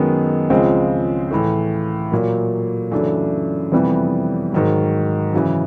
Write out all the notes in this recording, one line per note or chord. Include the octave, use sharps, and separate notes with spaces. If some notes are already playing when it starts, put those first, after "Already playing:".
Already playing: F#2 D#3 G#3 B3
C#2 C#3 F3 G#3 C4
A2 E3 A3
A#2 F#3 A#3
F#2 C#3 E3 A3 D4
F2 C3 E3 G3 B3
G#2 D#3 F#3
F#2 C#3 E3